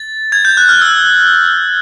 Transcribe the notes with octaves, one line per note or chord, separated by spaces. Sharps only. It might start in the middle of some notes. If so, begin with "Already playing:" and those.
Already playing: A6
G#6
G6
F#6
F6
E6